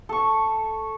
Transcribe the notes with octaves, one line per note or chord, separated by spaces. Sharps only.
A4 C#6